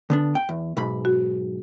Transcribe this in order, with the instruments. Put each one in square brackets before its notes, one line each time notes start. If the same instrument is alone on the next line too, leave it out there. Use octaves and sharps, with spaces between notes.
[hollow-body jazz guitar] D3 B3 D4
G5
E2
B1 G#2 B5
[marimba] F#4